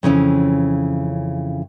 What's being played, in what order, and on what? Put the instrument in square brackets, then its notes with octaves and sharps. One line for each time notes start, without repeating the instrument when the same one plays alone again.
[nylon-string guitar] F2 C#3 E3 C#4